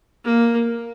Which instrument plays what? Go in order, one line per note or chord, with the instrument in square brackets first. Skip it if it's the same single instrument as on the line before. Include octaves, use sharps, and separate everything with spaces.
[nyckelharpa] A#3